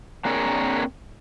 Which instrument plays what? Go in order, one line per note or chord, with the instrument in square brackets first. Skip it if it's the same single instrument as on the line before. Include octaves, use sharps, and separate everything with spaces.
[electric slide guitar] A#3 C4 D4 G#4 A#4 C#5